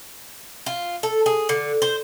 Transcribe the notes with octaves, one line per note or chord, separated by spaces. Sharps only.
F4
A4
G#4
D3
C5